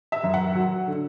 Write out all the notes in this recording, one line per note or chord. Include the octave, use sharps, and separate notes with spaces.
E5
F#2
F#5
F#3
D3